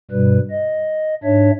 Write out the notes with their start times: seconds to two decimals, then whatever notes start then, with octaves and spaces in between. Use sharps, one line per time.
0.11 G2 B2 G3 B4
0.50 D#5
1.23 G#2 D4 C#5 E5